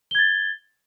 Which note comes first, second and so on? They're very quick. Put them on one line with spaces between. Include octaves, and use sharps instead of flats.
G7 G#6 A6